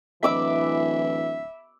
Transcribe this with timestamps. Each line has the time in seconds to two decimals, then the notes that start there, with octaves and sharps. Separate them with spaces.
0.23 D1 E3 E5 B5 D6 E6